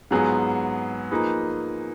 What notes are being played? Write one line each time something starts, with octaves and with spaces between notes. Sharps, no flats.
G#2 F#3 B3 F4 G#4
F3 A#3 D#4 G#4 B4